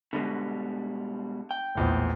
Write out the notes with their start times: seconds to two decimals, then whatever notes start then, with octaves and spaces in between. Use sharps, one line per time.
0.13 B2 D3 G3 G#3
1.51 G5
1.75 A#1 E2 A2